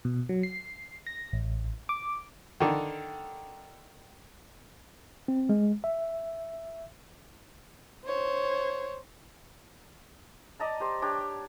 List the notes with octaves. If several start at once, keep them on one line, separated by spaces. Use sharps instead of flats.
B2
F#3
C7
A#6
A1
D6
D3 D#3
C4
G#3
E5
C5 C#5
D5 D#5 A5 A#5
G4 C5
D4 G4 C#5 G5